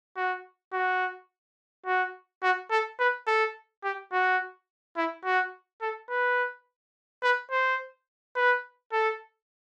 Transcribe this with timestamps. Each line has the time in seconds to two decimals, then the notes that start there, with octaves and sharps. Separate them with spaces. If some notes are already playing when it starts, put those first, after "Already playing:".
0.17 F#4
0.73 F#4
1.86 F#4
2.43 F#4
2.71 A4
2.99 B4
3.27 A4
3.83 G4
4.12 F#4
4.97 E4
5.25 F#4
5.81 A4
6.10 B4
7.23 B4
7.51 C5
8.36 B4
8.92 A4